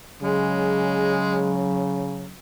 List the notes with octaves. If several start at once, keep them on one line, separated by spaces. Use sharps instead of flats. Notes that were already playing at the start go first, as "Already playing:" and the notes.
C#3 F#3 G#3